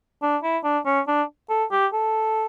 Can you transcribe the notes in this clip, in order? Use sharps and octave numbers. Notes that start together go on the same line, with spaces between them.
D4
E4
D4
C#4
D4
A4
G4
A4